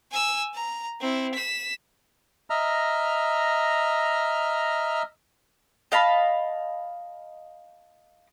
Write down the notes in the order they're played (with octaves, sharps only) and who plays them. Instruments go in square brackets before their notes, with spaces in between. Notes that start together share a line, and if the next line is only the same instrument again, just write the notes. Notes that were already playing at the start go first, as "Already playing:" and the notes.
[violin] G#5 E6
A#5
C4 E4
B6 E7
[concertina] D#5 E5 A#5 F6
[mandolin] D#5 F5 A5 B5